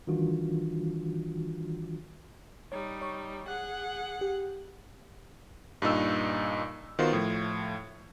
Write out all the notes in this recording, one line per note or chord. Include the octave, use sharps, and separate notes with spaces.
D#3 E3 G3 D4 F4 F#4
G3 D#4 C#5
C#5 C#6
G#4 F#5 F#6
G4
G2 A#2 D#4 E6
D#3 B3 F4 F#4 C5
A2 F3